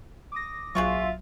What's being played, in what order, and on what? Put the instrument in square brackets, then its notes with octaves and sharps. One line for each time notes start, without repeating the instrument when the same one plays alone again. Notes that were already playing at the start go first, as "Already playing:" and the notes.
[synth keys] D6 D#6 A#6
[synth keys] A#1 F#3 [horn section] F4 E5 [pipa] G#4 F#5 C#6